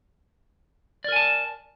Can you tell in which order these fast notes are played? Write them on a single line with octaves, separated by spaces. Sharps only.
D5 A#4 G#5 A5